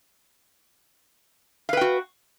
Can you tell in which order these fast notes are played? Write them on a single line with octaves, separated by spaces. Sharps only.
F5 B4 G5 F#4